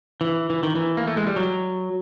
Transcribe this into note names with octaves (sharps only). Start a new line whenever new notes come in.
E3
E3
D#3
E3
A#3
A3
G#3
G3
F#3